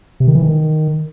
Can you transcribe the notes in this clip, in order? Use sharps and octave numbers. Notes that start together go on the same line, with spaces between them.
C3
D#3
E3
D#3